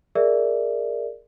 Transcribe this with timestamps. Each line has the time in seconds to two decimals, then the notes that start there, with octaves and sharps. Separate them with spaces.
0.15 G#4 A#4 D5 E5